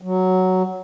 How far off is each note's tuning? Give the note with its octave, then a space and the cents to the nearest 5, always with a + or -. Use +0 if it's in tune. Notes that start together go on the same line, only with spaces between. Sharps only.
F#3 +5